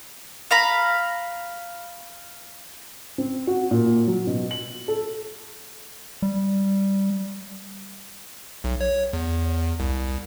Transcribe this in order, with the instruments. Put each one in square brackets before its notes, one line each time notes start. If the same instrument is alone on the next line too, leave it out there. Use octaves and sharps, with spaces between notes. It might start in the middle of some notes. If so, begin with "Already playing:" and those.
[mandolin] F5 A#5 B5
[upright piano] C4
F#4
A#2
F#3
B2
F#7
A4
[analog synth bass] G3
[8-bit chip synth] B1
C#5
E2
C2